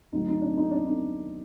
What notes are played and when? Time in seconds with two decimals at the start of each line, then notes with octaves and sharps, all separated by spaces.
0.12 D2 D3 F#3 D#4
0.28 D#4
0.41 D4
0.57 D#4
0.71 D4
0.86 D#4